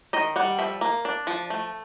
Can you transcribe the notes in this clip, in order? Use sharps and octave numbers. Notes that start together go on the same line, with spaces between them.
D#3 D#5
G3 F#5
F3 E5
A#3
D4
F3
A3